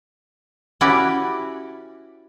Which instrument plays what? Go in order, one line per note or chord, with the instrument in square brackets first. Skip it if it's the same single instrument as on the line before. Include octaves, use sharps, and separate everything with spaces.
[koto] C#4 E4 F#4 G4 B4 D5